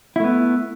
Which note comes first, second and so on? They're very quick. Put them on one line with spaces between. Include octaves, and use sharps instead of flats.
E4 A3 B3